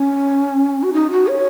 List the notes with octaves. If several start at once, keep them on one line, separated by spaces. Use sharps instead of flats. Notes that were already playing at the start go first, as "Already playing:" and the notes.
Already playing: C#4
F#4
D#4
F#4
C#5